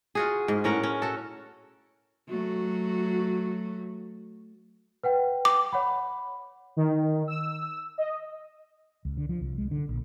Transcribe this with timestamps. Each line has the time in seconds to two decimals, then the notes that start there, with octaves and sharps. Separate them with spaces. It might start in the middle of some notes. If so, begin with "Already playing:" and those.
0.15 F4 F#4 G#4
0.48 G#2
0.64 A2 C#4 A#4 F#5
0.83 C#4
1.02 F#4 A4
2.29 F#3 A3 F#4
5.03 B4 F#5 G5
5.45 D6
5.72 C#5 F#5 B5
6.77 D#3
7.28 E6
7.98 D#5
9.05 C#2
9.17 D3
9.29 F3
9.41 C2
9.58 G#3
9.71 D3
9.89 A#1